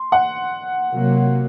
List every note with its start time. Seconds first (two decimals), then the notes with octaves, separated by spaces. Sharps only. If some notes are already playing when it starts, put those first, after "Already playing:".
Already playing: C6
0.12 F#5
0.93 C3 F#3 A#3